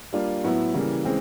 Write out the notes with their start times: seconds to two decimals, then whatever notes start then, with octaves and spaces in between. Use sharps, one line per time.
0.13 G3 A#3 D4 F4
0.44 A2 F#3 B3 E4
0.74 C#3 E3 G3 A#3
1.04 C#3 E3 G#3 C4